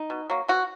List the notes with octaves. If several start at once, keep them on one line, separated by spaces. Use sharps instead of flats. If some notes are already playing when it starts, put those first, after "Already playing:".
Already playing: D#4
B2
F#3 A#3
B2 F#4